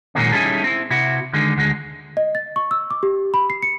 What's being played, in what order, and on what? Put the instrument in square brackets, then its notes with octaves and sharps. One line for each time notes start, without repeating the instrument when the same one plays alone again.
[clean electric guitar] A#2 D#3 F#3 G#3 A#3 C#4
G3 C#4 D#4 E4 G#4 A4
C4 E4
C3 E4 F#4
D3 D#3 G#3
D2 D3 G#3
[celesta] D#5
A6
C#6
E6
D6
G4
B5
C7
C#7